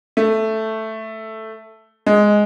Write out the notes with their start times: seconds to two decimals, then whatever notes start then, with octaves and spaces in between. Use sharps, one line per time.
0.17 A3
2.07 G#3